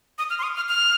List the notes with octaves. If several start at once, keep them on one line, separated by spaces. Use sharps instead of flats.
D#6
F6
C6
D#6
F6
F6